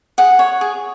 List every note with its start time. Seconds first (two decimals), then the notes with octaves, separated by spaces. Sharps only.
0.18 G#4 F#5
0.39 C#5
0.61 G#4